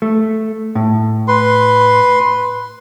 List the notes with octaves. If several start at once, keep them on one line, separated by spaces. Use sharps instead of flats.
A3
A2
B4 C6